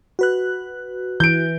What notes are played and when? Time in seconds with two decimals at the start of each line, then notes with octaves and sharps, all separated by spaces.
0.19 F#4 B4 F#6
1.20 E3 G6 D7